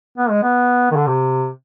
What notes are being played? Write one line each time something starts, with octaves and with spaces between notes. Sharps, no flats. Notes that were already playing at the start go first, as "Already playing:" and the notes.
B3
G#3
B3
D#3
D3
C3